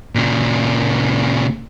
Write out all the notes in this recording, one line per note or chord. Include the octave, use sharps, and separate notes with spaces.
A#2 C#3